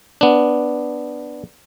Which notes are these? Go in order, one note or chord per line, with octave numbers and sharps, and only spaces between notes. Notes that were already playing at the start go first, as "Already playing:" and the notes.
B3 D4